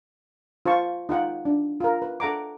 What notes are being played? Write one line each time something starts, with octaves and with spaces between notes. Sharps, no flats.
F4 C5 A5 C#6
D#4 F4 F#5 G5
D4
F4 A#4
B4
A4 F#5 A#5 D6